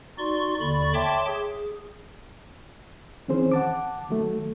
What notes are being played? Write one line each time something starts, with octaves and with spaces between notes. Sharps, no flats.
D#4 F#4 D5 C6 C#6
D#2 D3 D5 B5 C#6 A6
C#5 E5 G5 A5 C6 D6
G#4
D#3 E3 C4 C#4 G#4 C5
F#5 A5 D6
D#3 F#3 A3